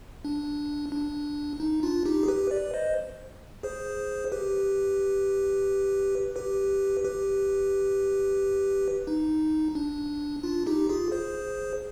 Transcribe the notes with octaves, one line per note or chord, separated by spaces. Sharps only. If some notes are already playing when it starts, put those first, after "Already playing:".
D4
D4
D#4
D4 F4
D#4 G4
G#4
G4 B4
B4 D5
C5 D#5
G#4 C5
G4 B4
G4 B4
G4 B4
D#4
D4
D4 F4
D#4 G4
F4 G#4
G#4 C5